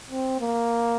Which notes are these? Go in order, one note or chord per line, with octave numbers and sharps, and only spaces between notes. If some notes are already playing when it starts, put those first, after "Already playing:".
C4
A#3